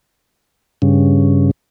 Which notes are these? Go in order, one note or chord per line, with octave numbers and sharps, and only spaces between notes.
G2 C#3